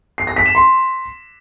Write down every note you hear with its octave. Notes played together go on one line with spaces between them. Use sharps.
C7
A#6
B6
E7
C6